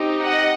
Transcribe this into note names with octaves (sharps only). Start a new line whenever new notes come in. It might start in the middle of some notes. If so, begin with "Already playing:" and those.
Already playing: C4 D#4 G4
D#5 F#5